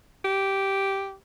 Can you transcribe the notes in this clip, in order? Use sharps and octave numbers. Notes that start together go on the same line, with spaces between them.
G4